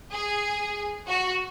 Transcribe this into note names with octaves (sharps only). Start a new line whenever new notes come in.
G#4
F#4